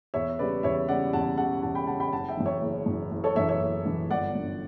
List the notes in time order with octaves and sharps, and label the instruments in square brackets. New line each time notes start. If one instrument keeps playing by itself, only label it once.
[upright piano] E2 C#5 E5
C#3 G3 B4 D5
E2 C#5 E5
C#3 G3 D5 F#5
E2 F#5 A5
C#3 G3 F#5 A5
E2 F#5 A5
G5 B5
C#3 G3 F#5 A5
G5 B5
F#1 F#5 A5
E5 G5
F#2 E3
C#5 E5
F#1
F#2 E3
F#1
A4 C#5
F#2 E3 C#5 E5
C#5 E5
F#1
F#2 E3
G1 D5 F#5
F#2 D3